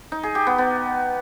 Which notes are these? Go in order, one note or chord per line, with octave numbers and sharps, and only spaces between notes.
D#4
G#4
G4
B3
B3